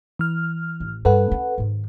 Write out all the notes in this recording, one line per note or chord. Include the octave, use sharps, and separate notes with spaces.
E3 F6
A1
G2 A4 B4 F#5
C#4
G#2 D#3